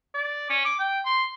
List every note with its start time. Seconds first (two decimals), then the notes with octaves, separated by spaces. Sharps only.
0.14 D5
0.50 C#4
0.65 D6
0.80 G5
1.05 C6